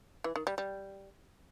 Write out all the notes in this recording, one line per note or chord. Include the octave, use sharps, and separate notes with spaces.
E3
D#3
G3
G3